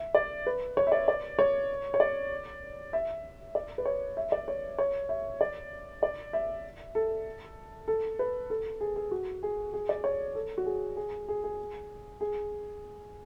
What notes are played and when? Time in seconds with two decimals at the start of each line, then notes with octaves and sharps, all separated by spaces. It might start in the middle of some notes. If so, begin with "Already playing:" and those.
Already playing: E5
0.15 D5
0.47 B4
0.77 C#5
0.87 E5
0.92 D5
1.08 D5
1.39 C#5
1.94 C#5
2.00 D5
2.93 E5
3.55 D5
3.78 B4
3.86 C#5
4.17 E5
4.32 D5
4.48 C#5
4.78 C#5
5.09 E5
5.41 D5
6.03 D5
6.33 E5
6.95 A4
7.88 A4
8.19 B4
8.50 A4
8.81 G#4
8.96 G#4
9.11 F#4
9.43 G#4
9.73 G#4
9.89 D5
10.04 C#5
10.35 A4
10.58 F#4
10.66 G#4
10.97 G#4
11.29 G#4
11.44 G#4
12.21 G#4